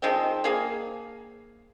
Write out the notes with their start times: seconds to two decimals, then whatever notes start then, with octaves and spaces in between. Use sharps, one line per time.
0.02 D#3 F3 G#3 C4
0.44 A#3 G#4 F5 G#5